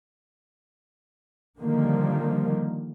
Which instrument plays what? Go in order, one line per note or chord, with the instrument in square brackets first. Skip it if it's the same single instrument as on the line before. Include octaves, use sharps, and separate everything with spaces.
[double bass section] D3 D#3 F3 G3 A#3